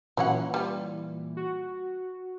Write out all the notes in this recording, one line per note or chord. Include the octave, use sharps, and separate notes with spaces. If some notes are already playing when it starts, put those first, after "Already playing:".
A#2 E3 F#3 C#4 F#5
G3 F4
F#4